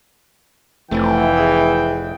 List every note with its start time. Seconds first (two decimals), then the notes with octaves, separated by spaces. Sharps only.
0.91 F1 E3 A3 C4 E4 G5
1.37 G#4 D#6